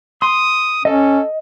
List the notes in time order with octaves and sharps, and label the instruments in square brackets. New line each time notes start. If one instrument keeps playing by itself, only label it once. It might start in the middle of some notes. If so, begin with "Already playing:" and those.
[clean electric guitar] C6 [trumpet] D#6
[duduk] C#4 [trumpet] A4 [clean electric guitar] D#5